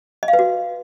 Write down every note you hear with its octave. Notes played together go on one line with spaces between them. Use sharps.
D#5
F5
B4
F#4